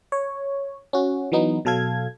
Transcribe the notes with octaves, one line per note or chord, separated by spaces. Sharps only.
C#5
C#4 F#4
E3 F#3 B3 D#4
B2 F#3 A4 F5 G#6